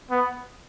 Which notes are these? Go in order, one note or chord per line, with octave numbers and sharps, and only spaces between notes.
B3